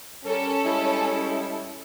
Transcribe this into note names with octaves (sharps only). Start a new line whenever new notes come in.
G3 C#4 A4 A#4
G3 G#3 E4